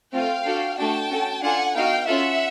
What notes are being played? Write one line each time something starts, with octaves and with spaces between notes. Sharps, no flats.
A3 C4 F4 F5 G5
D4 F#4 A4
A3 D4 F#4 G5 A5
C#4 F#4 A4
D4 F4 A4 F#5 G#5
B3 D#4 F#4 F5 G5
C#4 F4 A4 E5 F#5